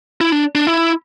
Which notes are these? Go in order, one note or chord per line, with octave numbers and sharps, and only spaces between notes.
E4
D4
D4
E4